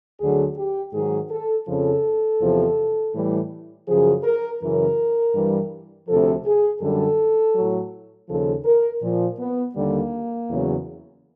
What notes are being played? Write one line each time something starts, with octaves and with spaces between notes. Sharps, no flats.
D2 D3 F#3 G#4
G4
G#2 D#3 F#3 G#4
A4
F2 C#3 F3 A4
E2 C3 F3
A2 E3 G3
F#2 C#3 F3 G#4
A#4
F#2 C#3 E3 A#4
G2 E3 G3
D2 C3 F3 A4
G#4
F#2 D3 G3 A4
A2 F#3
D#2 C#3 F3 A4
A#4
A#2 F3
B3
D#2 D3 G3 A#3
E2 C#3 F#3